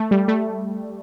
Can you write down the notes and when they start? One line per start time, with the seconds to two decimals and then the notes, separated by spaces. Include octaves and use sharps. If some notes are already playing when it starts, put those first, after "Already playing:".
Already playing: A3
0.11 G3
0.28 A3